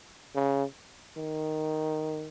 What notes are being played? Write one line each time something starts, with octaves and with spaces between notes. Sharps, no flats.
C#3
D#3